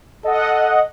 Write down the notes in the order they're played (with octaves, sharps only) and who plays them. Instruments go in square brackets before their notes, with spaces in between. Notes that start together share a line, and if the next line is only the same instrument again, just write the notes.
[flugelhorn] A4 [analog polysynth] D#5 F#5